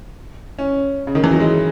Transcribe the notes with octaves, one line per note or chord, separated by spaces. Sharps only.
C#4
C#3
D#3
E3
F#3
G#3